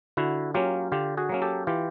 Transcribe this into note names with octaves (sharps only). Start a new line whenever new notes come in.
D3 E4 F#4
F#3 A#3 C#4 F4 G4
D3 F4 G4
F#4 G#4
F#3 A#3 C#4
G4 A4
E3 F4 G4